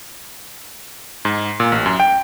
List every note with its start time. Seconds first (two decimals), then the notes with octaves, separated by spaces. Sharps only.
1.25 G#2
1.60 A#2
1.72 A1
1.86 F#2
2.00 G5